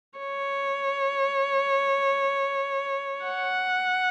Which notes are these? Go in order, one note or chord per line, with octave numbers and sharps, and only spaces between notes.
C#5
F#5